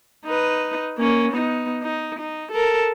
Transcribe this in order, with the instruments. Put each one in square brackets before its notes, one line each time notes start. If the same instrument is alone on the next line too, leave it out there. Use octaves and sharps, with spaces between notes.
[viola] D#4 B4
A#3 C#4
B3 D#4
D#4
D#4
A4 A#4